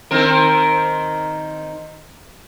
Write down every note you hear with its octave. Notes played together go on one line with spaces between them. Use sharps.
D#3 C4 A#4